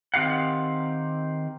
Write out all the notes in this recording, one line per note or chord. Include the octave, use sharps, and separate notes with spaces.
D#3 C4 G4 F5 F#5